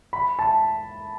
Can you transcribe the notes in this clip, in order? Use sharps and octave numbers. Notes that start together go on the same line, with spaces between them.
B5
A5